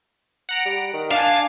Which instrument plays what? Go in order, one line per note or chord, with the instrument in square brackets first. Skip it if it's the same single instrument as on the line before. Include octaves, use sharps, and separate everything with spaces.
[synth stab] F#5 A#5 D7
[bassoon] G3
D#3
[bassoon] D4 [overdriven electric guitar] F5 [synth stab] G#5 A5